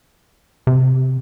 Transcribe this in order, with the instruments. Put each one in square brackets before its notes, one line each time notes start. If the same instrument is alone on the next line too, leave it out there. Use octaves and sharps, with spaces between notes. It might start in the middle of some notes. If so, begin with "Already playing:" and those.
[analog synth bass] C3